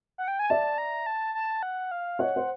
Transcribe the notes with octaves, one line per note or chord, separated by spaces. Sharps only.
F#5
G5
G#5
D5 E5 A5
A#5
A5
A5
F#5
F5
C#5 D#5 F#5
C5